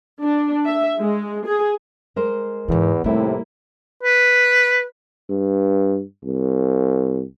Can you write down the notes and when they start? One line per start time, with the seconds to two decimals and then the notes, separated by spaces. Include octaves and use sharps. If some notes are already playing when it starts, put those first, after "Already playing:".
0.23 D4
0.66 E5
0.99 G#3
1.46 G#4
2.16 G#3 A#4 C5
2.68 E2 G#2 E3 B3
3.04 D#2 A2 C3 G3 A3 A#3 E4
4.03 B4
5.30 G2
6.25 C2